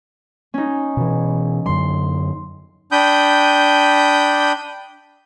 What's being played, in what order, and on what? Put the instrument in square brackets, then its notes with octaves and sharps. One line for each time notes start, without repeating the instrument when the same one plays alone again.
[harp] C#4 D#4
[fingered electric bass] B2 E3
[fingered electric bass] F#2 D3 F#3 [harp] C6
[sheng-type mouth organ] D4 G5 B5 D#6 G6